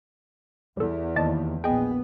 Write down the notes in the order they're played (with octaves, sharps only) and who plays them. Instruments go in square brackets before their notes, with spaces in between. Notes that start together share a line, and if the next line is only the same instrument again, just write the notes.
[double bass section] E2 [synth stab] G3 A4
[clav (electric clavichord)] D#2 [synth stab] D5 D#5 A5
[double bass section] A#1 B3 [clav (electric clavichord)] G#4 G#5 [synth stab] D#5 G5